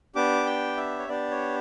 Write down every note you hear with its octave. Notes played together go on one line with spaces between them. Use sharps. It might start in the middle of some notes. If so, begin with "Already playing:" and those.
B3 D4 G4 D6
G5
E5
C#5
B3 D4 G4 D5
C#5